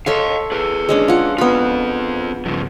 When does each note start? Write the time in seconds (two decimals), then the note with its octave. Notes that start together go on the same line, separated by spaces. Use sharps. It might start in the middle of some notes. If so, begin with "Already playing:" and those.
0.06 A4 C#5 D#5 F5 C6
0.52 G#4 B4
0.89 G#3 C#4 D4
1.08 F4 F#5
1.38 B3 C4 F4 B5
2.45 G2 C#3 F3